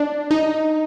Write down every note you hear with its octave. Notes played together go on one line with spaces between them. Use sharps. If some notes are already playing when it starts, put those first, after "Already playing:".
Already playing: D4
D#4